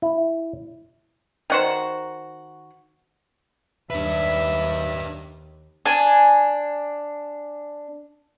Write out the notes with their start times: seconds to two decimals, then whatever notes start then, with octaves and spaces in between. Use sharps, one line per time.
0.02 E4
1.50 D#3 F#4 C5
3.90 D#2 D4 B4 E5
5.86 D4 G#5